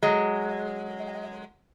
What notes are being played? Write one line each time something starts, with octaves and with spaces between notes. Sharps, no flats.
F#3 G#3